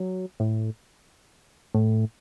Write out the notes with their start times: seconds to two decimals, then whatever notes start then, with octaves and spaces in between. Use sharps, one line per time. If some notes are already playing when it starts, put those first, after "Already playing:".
Already playing: F#3
0.40 A2
1.74 A2